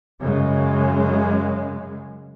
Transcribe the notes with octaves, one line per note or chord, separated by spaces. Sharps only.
F#2 C#3 G#3